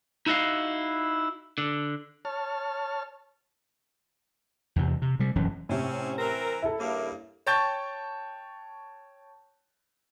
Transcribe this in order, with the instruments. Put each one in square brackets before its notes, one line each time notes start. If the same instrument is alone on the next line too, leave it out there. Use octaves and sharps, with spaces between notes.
[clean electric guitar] D#4 E4 F#4 D#5 F5
D3
[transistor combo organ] C#5 A5 F6
[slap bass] E2 C3
C3
C3 G3
E1 F#2 E3 C#4
[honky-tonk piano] A2 C3 [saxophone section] C4 C#4
[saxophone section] E3 C4 A#4
[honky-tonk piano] E4 A4
[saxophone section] G2 C#3 A#3
[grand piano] C#5 G5 A5 C#6 G6 A6